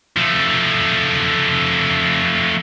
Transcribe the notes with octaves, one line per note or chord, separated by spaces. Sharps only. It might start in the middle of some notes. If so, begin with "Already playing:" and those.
F3 A3